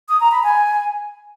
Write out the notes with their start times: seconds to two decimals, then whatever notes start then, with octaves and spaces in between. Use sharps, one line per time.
0.09 D#6
0.20 A#5
0.32 B5
0.43 G#5